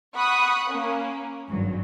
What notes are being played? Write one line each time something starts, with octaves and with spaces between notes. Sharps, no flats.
F#5 B5 C#6 D#6 F#6
A#3 C#4
G#1 G2 F#3